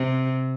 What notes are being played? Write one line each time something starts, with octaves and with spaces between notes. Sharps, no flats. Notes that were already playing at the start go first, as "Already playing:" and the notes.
Already playing: C3